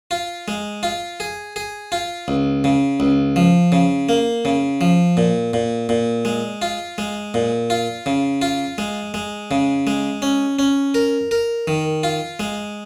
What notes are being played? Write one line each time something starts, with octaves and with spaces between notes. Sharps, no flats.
F4
G#3
F4
G#4
G#4
F4
C#2
C#3
C#2
F3
C#3
A#3
C#3
F3
A#2
A#2
A#2
G#3
F4
G#3
A#2
F4
C#3
F4
G#3
G#3
C#3
G#3
C#4
C#4
A#4
A#4
D#3
F4
G#3